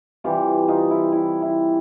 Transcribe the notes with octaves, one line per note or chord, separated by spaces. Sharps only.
C3 E3 G3 F4 G4
D#4 F4
E4
E4
E4